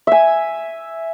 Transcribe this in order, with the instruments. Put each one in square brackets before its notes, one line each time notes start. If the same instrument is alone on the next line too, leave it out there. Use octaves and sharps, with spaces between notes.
[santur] E5 G#5